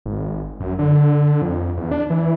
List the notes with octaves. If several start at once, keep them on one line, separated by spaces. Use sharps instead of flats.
G#1
F#2
D3
F2
E2
D4
E3